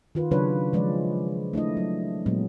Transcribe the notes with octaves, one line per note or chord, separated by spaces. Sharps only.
D#3 F4 B4
C#3 F#3 D4 B4 C#5
F3 G#3 B4 D5
A3 D4 E4 D#5
F#3
A#2 F#3 G#3 B3